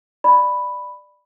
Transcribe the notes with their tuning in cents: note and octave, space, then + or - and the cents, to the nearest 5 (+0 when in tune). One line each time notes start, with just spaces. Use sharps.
D5 +15 B5 +0